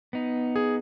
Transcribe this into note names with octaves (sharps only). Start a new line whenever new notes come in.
B3 D#4
G#4